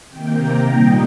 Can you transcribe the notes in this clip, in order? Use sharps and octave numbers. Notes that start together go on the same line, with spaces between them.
C3 D#3 A#3 G5
A#5
A#2 G3 D#4 G5